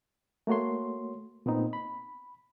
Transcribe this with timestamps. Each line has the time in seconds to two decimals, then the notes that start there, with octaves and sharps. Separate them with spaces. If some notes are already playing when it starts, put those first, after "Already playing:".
0.47 A3 A#3 F#4 C#5 C6
1.46 A#2 B3 C4 D#4
1.73 B5